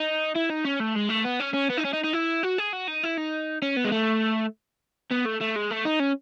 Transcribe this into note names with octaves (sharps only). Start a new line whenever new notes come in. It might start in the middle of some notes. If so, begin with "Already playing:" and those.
Already playing: D#4
E4
D#4
C#4
A3
G#3
A3
B3
C#4
C#4
B3
D#4
C#4
D#4
D#4
E4
F#4
G#4
F#4
D#4
E4
D#4
C#4
B3
G#3
A3
B3
A3
A3
G#3
A3
D#4
C#4